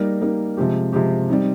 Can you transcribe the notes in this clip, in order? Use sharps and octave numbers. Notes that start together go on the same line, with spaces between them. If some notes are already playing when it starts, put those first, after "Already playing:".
Already playing: G3 A#3 D#4 A#4
G3 A#3 D#4 A#4
C3 F3 G#3 C4 G4
C3 F3 G#3 C4 G4
G3 C4 D#4